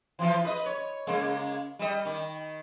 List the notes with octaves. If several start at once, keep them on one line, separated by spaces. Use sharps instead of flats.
E3 F3 F4
B4 D#5
C#5
C#3 G#3 A#3
G3 D#5
D#3